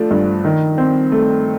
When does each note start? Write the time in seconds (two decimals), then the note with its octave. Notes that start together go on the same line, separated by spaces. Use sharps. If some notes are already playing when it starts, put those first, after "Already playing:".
Already playing: F3 A3 D4
0.11 G2
0.45 D#3
0.78 C4
1.12 A3